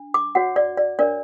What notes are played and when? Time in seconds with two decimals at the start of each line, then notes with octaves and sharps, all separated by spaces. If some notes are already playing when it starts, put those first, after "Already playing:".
Already playing: D4
0.14 D6
0.35 F#4 C#5 F#5
0.56 D5
0.77 D5
0.99 D4 A#4 C#5 D5